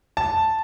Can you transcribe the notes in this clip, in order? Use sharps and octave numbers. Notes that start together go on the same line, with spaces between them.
A5